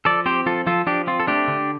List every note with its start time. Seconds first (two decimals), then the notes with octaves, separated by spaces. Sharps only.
0.05 F3 A4 D5
0.26 C4 G4 C5
0.46 F3 F4 A4
0.67 F3 F4 A4
0.86 F3 D4 G4
1.07 C4 F4
1.20 A4
1.27 A3 D4 G4
1.48 D3